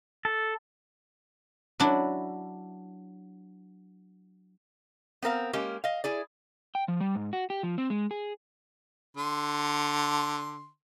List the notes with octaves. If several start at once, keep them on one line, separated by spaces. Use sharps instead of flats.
A4
F#3 D4 E4
B3 C4 A#4 F5
G#3 A#3 C#4 G4
D#5 F5
E4 G#4 D5
G5
F3
G3
G#2
F#4
G4
F3
C4
G#3
G#4
D3 C6